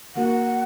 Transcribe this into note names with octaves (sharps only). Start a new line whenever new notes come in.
D#3 A#3 F#4 A#4 F#5